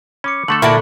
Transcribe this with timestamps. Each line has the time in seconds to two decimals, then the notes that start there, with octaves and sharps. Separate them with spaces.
0.24 C#4 B5 D6 C#7
0.48 D3 A3 A4 C#6 F#7
0.62 A#2 D3 A#3 E4 F#4 D5 A5